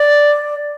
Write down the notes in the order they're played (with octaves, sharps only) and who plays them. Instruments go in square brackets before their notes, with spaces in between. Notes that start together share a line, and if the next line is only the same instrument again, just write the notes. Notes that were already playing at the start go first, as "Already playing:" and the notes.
Already playing: [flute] D5